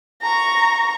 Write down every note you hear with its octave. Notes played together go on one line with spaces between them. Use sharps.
A#5 C#6